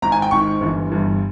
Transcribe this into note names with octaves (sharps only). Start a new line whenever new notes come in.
G#1 G#2 D#3 A#5
G#5
G5
G#1 G#2 D#3 C#6
G1 G2 E3
G1 G2 E3